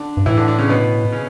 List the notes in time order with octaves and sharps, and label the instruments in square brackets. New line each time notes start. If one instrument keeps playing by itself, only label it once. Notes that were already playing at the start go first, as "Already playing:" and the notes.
Already playing: [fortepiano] D3 D4
[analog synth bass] G2
[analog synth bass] A2 [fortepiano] E3 E4
[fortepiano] D3 D4
D3 D4
C#3 C#4
B2 B3
C#3 C#4